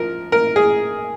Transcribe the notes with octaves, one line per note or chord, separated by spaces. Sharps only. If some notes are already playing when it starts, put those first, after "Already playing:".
Already playing: F3 A#4
A#4
G#4